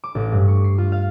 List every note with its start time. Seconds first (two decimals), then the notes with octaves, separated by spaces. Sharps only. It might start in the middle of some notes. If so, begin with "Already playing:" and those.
0.04 D6
0.15 A1
0.32 G2
0.48 C#6
0.64 C7
0.78 F4
0.92 F5